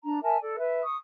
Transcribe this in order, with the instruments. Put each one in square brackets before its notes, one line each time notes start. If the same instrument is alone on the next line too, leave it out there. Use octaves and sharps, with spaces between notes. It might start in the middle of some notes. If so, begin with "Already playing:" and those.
[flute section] D4 A#5
A#4 E5 G#5 A5
A4 D5
B4 E5
C#6 D#6